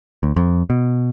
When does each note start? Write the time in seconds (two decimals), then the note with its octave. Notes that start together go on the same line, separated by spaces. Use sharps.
0.23 D2
0.36 F2
0.70 B2